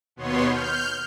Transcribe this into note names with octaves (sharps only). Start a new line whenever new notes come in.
D#2 B2 B3 C#5 C6
F6 G6